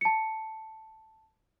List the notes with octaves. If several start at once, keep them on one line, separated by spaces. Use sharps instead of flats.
A5 C#7